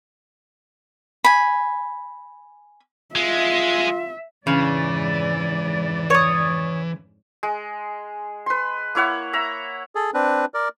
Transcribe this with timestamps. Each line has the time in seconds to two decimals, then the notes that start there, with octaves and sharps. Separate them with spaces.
1.24 G#5 B5
3.15 G#3 F4 E5
4.47 F2 G#2 C#3 E3 D5
6.10 C#5 D#6
7.43 G#3
8.46 B4 C6
8.95 A#3 E4 C#5 F#5
9.33 E5 A#5
9.95 G#4 A4
10.14 C4 D4 B4
10.54 A#4 D5